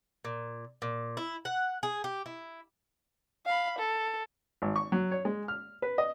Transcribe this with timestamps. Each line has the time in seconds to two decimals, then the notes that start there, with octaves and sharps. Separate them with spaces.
0.25 A#2
0.82 A#2
1.17 E4
1.45 F#5
1.83 G#4
2.04 G4
2.26 E4
3.46 F5 B5
3.78 A4
4.62 G#1
4.76 C#6
4.92 F#3
5.12 C#5
5.25 G#3
5.48 F6
5.82 B4
5.98 D#5